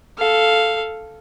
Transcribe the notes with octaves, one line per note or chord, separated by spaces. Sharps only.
A4 F5